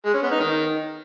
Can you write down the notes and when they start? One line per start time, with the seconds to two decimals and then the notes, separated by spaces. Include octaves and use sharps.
0.05 G#3
0.14 C#4
0.22 B3
0.31 D#4
0.40 D#3